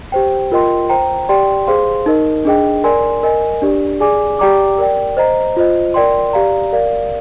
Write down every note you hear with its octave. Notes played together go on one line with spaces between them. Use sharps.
G4 C5 G5
F4 A#4 D#5 G5 C6
C5 G5 A#5
G4 D5 G5 C6
G#4 C5 F5 C6
D#4 A#4 D#5
D4 G#4 D#5 G5
A#4 D5 G#5 C6
A#4 D#5 G#5
D4 G4 D5
G#4 D5 G#5 D6
G4 D5 G5 A#5 D6
A#4 D5 G5
C5 D#5 A#5
F4 C5 D#5
A#4 D5 G5 C6
G4 D5 F5 A#5
A#4 D5 F5